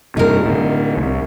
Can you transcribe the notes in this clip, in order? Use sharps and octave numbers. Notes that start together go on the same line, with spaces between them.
G2 C3 D#4 A#4
A2 D3
C2